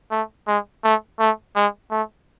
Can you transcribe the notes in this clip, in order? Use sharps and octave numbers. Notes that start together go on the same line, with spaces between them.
A3
G#3
A3
A3
G#3
A3